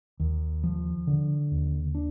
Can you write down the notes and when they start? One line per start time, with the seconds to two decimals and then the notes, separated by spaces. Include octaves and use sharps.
0.20 D#2
0.64 F3
1.07 D3
1.51 D#2
1.95 D4